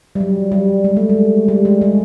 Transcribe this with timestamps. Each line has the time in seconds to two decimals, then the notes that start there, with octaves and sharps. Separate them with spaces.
0.15 G3
0.20 F#3
0.52 G3
0.84 G#3
0.97 A3
1.09 G#3
1.48 G3
1.65 G#3
1.81 G#3